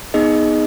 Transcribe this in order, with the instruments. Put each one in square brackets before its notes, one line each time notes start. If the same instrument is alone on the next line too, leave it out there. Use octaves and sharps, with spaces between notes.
[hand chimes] B3 D#4 G#4 D#5